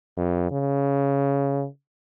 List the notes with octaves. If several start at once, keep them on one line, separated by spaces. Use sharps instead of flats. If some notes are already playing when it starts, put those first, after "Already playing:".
F2
C#3